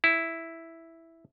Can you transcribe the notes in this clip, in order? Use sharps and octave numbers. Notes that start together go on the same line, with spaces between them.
E4